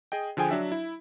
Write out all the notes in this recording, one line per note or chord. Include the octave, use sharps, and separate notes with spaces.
G#4 D#5 G5
D3 F3 G#4 G5 G#5
F#3 D4 E5
E4